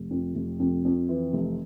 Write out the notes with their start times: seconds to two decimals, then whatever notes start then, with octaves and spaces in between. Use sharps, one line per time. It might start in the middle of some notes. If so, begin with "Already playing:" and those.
Already playing: F1
0.11 F2
0.35 F1
0.60 F2
0.85 F2
1.09 E3
1.33 F1